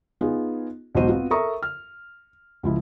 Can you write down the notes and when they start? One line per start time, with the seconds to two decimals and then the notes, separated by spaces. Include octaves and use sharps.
0.21 B3 D#4 F4 G#4
0.95 B1 E2 G#2 F#4 C5 D#7
1.08 B3 C4 F4 F#4
1.31 A4 A#4 E5 A#5 C#6 D#6
1.63 F6
2.63 C#2 F3 E4